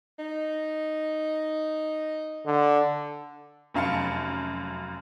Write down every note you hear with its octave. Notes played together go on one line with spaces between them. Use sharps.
D#4
D3
F1 F#2 F5 A5 C#7